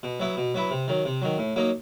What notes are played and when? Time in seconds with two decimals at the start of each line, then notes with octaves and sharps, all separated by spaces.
0.03 B2
0.20 F#3 B3 E4
0.37 B2
0.54 F#3 B3 E4
0.71 C3
0.88 D#3 F#3
1.05 C3
1.22 D#3 F#3
1.38 A2
1.56 F#3 A#3 D#4